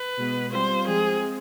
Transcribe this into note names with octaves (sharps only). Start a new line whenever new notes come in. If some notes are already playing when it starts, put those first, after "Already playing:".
Already playing: B4
B2 G#3 B3
G3 C4 F4 C5
F3 G#3 C4 G#4